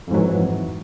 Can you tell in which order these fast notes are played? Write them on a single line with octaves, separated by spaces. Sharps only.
F2 G#2 F#3 E3